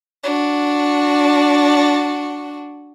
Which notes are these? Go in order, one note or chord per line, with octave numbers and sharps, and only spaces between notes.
D4 F#4